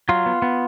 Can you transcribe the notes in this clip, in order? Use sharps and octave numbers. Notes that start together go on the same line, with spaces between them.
F#3 F4
B3
B3